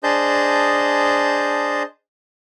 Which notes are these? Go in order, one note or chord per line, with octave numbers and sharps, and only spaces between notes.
D4 G#4 C5 D#5 A5 G6